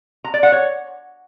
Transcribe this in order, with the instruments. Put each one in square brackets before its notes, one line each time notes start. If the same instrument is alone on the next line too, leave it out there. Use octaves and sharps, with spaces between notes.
[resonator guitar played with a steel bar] A#5
D5
F#5
C#5